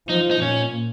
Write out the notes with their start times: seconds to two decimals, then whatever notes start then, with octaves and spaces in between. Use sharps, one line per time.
0.09 F3 D#4
0.31 D#4
0.41 A#2 C#4